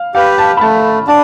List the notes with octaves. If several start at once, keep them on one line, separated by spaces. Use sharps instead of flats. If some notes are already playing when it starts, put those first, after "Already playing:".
Already playing: F5
G4 B4 F5
A5
B5
A3 A5
D4 A5